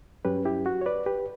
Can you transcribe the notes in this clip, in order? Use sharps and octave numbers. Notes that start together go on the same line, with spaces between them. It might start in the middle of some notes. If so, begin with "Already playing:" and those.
G2 F#3 C#4 G4 B4
E4 G4
F#4
C#5
B4 D5
G4 B4